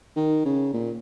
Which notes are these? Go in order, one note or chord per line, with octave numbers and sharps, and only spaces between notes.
D#3
C#3
A#2